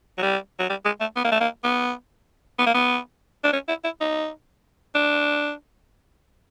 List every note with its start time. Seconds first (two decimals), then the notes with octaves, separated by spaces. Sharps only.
0.18 F#3
0.22 G3
0.59 F#3
0.69 G3
0.85 G#3
1.00 A3
1.16 B3
1.24 A#3
1.32 A3
1.40 A#3
1.64 B3
2.59 B3
2.66 A#3
2.74 B3
3.44 D4
3.53 C#4
3.68 E4
3.84 E4
4.01 D#4
4.95 D4